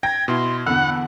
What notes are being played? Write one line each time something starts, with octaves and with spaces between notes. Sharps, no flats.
G5 G#6 A#6
B2 E4 C6
E2 D3 F#5 B5 E6